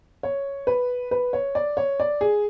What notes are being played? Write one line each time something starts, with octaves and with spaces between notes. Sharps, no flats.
C#5
B4
B4
C#5
D5
C#5
D5
G#4